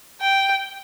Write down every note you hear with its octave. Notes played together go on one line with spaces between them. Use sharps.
G5